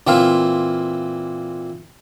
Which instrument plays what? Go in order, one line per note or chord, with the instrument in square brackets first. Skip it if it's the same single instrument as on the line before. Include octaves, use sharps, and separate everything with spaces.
[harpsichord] A#2 E3 C4 E5 F5